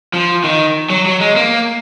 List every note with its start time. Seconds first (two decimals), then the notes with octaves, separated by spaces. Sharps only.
0.14 F3
0.44 D#3
0.90 F#3
1.06 F#3
1.20 G#3
1.36 A#3